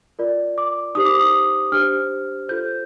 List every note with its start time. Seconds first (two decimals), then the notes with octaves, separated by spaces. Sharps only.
0.19 F4 A#4 D5
0.58 D6
0.95 D#4 G4 C5 D#6
1.05 D6
1.15 D#6
1.72 D4 G4 C5 F6
2.49 F4 A4 C5 G6